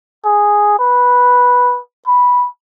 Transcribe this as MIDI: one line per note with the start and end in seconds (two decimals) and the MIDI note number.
0.25 0.76 68
0.79 1.79 71
2.07 2.47 83